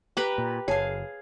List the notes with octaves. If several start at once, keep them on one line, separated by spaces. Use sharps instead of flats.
G4 B4 A#5
A#2
F#1 G#4 C#5 F5 A5